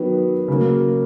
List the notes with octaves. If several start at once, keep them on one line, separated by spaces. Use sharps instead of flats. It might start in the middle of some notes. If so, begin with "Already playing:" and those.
Already playing: D#3 F#3 B3
C#3 F#3 A#3